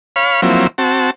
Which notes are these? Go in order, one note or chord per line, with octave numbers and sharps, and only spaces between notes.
C#5 F5 B5
F3 F#3 A#3 C4 E4
C4 F#4 A5